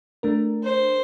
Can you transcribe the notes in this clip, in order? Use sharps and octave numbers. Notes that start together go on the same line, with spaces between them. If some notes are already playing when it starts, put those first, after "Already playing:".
A3 D4 A#4
C5